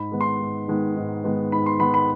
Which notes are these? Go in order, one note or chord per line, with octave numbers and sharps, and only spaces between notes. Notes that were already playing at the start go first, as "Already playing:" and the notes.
Already playing: G#2 B5
D#3 G#3 B3
C6
G#2
D#3 G#3 B3
G#2
D#3 G#3 B3
G#2 B5
C6
D#3 G#3 B3 B5
B5